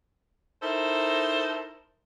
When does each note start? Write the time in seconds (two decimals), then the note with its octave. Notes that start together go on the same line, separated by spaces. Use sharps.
0.62 D#4 E4 A4 A#4 C5